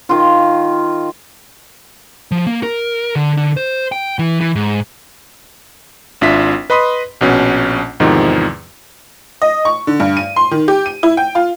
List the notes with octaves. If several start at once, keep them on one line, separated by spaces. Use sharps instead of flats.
D#3 F4
F3
A#3
A#4
D3
D3
C5
G5
E3
E3
G#2
G#1 D4 F4 E5 B6
B4 D#5 B5 C6 D#6
A#1 B2 C#4
E2 G#2 C3 D#3 F3
D#5
C#6
D3
G2
D#7
C6
D#3
G4
D#7
E4
G5
F4